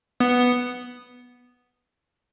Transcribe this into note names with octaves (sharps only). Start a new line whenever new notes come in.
B3